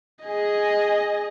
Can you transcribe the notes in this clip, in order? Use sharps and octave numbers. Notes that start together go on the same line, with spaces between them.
G#4 D#5